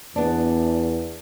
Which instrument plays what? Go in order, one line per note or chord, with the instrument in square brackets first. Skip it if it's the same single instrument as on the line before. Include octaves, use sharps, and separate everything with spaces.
[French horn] E2 [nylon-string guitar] B3 D4